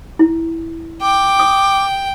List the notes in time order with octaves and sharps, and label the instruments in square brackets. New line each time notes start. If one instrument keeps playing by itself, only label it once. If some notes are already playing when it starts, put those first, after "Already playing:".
[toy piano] E4
[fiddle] G5 [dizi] D6
[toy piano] D#6